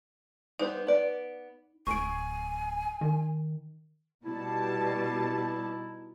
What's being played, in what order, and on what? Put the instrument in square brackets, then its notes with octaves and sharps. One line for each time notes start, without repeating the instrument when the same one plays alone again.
[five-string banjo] G3 B3 C5 [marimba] D#4
[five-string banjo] B3 D5
[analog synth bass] D1 [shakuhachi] G#5 [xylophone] C#6 D7
[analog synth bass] D#3
[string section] B2 G3 A5 [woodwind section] D#4 E4